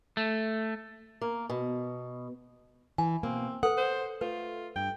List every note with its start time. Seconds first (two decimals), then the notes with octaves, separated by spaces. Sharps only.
0.17 A3
1.22 A#3
1.50 B2
2.98 E3 G#5
3.23 B2 A#3 C4
3.63 A4 B4 F#5
3.77 C5
4.21 A3 F4 B4
4.76 G2 G5